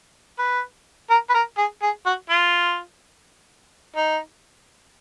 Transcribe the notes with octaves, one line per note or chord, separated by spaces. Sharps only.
B4
A#4
B4
A#4
G#4
G#4
F#4
F4
D#4